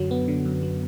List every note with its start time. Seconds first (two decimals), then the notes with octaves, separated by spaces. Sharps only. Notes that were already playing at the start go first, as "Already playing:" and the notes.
Already playing: F#2 D3 F#3
0.11 B3
0.28 D3
0.45 F#2
0.63 F#3